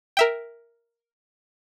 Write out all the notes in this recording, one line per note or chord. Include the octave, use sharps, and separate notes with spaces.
A#4 E5 G5